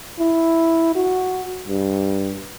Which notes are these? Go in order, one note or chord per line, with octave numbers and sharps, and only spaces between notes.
E4
F#4
G2